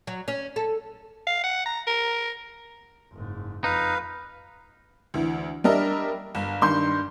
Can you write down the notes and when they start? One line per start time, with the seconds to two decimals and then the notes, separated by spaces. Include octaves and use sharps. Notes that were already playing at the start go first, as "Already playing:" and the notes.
0.07 F#3
0.28 C#4
0.56 A4
1.27 F5
1.44 F#5
1.66 A#5
1.87 A#4
3.12 F#1 G#2
3.64 F2 D#4 B4 F5
5.14 D2 E3
5.64 G3 D4 A#4 D#5 E5
6.35 G1
6.62 G2 D#3 C6 G6